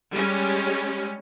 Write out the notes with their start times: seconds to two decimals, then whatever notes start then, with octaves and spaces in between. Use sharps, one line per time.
0.15 G3 G#3 C#4